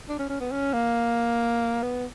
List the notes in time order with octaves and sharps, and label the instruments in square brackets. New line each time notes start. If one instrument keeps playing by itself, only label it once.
[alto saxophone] D4
C#4
C#4
B3
C#4
A#3
B3